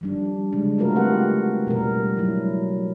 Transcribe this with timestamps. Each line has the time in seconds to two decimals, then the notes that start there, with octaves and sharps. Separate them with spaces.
0.01 F3 G3 D4
0.53 C#3 G#3 D4
0.78 A3 F4 F#4 A#4 B4
0.96 C4 G4 F#5
1.67 B2 G3 B3 A#4
2.17 F#3 E4